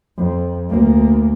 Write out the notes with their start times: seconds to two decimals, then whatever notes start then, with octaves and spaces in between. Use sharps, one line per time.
0.17 F2
0.69 D2 A#3